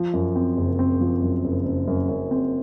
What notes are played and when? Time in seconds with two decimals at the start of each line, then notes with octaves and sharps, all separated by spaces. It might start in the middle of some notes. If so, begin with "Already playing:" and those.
Already playing: F3
0.13 F#2
0.36 C4
0.57 F#1
0.79 C4
1.00 F3
1.22 F#2
1.44 F#1
1.66 F#1
1.88 F#2
2.09 F#2
2.31 C4